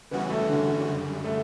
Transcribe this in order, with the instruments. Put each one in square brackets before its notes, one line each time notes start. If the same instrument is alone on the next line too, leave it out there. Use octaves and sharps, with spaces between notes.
[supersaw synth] C#3 E3 G3 C#4 F#4 [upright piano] B3
[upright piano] A3
D3
[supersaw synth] F#2 C#3 G3
[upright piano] A3